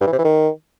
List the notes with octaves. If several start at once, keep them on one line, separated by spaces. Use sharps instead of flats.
G2
E3
C3
E3
D#3